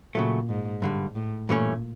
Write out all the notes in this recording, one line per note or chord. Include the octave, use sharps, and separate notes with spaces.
A#2 C#3 F#3 A3
G#2
G2 D3 G3
A2
G2 A#2 E3 A3 C#4